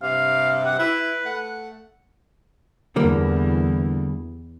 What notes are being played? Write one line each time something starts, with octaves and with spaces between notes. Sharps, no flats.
G2 C3 F5
F#5
E4 B4
A3 F#5
E2 D3 E3 G3 A#3